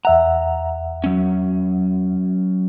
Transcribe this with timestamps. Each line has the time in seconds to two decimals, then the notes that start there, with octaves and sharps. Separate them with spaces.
0.05 E2 E5 F#5 A#5
1.04 F#3 C#4